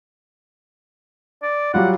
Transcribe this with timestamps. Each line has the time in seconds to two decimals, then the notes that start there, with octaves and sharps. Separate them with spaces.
1.43 D5
1.74 F#3 G3 F4 F#5